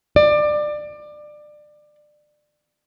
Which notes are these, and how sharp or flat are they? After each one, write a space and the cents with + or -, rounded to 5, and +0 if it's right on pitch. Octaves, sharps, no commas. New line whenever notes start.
D5 +25